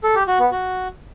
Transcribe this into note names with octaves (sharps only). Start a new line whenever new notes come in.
A4
G4
F#4
B3
F#4